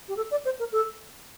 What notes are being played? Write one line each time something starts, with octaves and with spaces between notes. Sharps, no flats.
G4
A4
D5
C5
A#4
A4